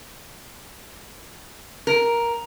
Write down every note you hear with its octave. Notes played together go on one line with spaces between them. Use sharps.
A#4